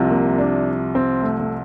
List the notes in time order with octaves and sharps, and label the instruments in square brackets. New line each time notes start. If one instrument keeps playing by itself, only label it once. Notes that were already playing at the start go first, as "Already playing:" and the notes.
Already playing: [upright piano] C2 C3 F3
A#3
D4
C4
A3
A3